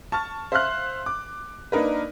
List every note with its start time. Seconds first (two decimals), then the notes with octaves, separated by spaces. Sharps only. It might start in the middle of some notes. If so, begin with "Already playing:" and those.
0.12 A5 C#6 F6 A6
0.52 C5 E5 F5 C6 F6 F#6
1.06 D6
1.72 A#3 D4 D#4 A#4 B4